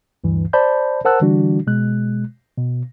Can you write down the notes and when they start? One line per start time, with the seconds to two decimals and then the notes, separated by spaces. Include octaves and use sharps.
0.24 D2 G2 E3
0.53 C5 D5 A5 B5 G6
1.05 A#4 C5 F#5 A5 E6 F#6
1.21 D3 E3 G3 D4 F#4
1.67 B2 G#3 F#6
2.58 B2